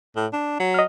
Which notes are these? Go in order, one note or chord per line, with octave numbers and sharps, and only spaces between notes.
A2
D4
F#3
D#5 F6